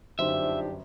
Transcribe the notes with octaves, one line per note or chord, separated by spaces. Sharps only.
G1 F#2 F3 D4 D#4 G4 C5 E5